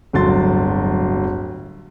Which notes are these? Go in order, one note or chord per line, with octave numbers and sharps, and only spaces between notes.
D1 G1 F#3 C6 A6